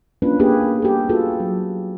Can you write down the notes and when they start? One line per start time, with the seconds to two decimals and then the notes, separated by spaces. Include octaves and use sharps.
0.22 A#3 C#4 D4 F4 B4
0.39 A#3 B3 G4 G#4 B4
0.82 G4 A4
1.09 F4 F#4 G#4 A4 B4
1.40 F#3